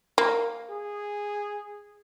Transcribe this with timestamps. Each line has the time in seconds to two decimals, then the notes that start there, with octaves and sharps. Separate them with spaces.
0.18 A#3
0.70 G#4